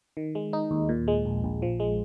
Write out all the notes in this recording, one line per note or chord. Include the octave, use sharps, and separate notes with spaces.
D#3
G#3
D#4
D#2
A#2
G#3
A#1
A#1
F3
G#3